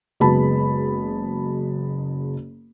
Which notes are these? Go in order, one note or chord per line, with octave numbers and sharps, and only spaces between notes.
F#1 G#3 B3 F#4 A5 B5